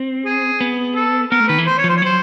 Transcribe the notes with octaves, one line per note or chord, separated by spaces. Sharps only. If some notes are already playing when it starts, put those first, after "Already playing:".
Already playing: C4
G#4
B3
A4
B3 A#4
A3
D#3 B4
E3
C5
C#5
F3
C5
C#5
F#3 C5